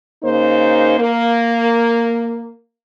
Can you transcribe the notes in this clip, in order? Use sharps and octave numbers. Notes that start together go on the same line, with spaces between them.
C#3 A#3 D#4 C5
A#3